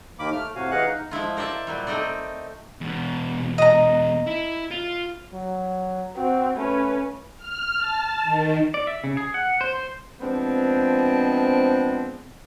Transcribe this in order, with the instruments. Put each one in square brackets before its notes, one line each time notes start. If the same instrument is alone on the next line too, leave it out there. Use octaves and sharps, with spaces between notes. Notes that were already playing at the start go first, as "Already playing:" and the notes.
[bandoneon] D#2 D#3 A#3 B5 D6
A3 F6
A2 C3 F#4 F5 G#5
E3 G#4 D#5 F5 F#5 F#6
D#4
[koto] F3 G#3 E4 F4
A#4 C5 D5 E5 A5
A#2 F#3 G3
A3 C4 D#4 A#4 C5 D5
[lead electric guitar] E2 B2
[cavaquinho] D#5 A#5
[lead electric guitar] E4
F4
[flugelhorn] F#3
[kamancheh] C4 [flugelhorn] F#4
[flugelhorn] A3 [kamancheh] C#4 B4
[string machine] F6
A5
D#3
[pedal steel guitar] D5
E5
C#3
G#4
F#5
C5
C5
[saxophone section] F3 G#3 B3 C4 D4